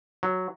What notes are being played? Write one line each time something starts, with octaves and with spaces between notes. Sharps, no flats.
F#3